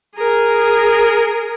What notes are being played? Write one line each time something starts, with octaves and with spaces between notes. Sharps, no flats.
G#4 A#4